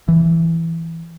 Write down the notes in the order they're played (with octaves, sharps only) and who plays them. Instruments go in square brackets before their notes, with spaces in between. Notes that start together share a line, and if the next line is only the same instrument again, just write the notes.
[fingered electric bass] E3